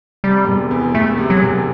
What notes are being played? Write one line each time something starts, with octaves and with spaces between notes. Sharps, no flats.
C3 G3
E1
E2
E1 A3
C3
F#3
E1